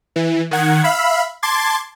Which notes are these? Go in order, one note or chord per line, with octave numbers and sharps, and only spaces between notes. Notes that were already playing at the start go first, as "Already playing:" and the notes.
E3
D#3 F#5 G#6
E5 F5 B5
A5 C6 D6 G#6 A6